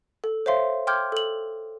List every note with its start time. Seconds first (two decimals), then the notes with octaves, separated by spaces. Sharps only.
0.24 A4
0.46 C5 C#5 E5 F5 C6
0.87 G5 C6 D6 F6 G6 G#6
1.12 A4 F#7